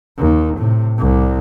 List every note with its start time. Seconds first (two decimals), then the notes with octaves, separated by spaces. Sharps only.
0.18 D#2
0.58 A2 C3
0.99 C2